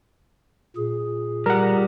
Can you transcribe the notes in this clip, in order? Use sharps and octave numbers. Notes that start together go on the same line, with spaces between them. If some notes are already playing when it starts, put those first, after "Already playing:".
A#2 G#4
G3 A#4 F#5